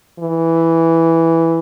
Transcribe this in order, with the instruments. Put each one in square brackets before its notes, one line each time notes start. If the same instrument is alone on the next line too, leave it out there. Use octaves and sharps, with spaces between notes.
[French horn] E3